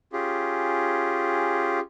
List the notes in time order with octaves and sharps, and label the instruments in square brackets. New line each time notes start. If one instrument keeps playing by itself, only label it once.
[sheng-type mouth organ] C#4 F4 G4 G#4